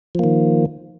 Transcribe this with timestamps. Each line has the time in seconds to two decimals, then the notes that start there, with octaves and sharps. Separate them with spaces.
0.15 F3
0.19 A#3
0.24 D#3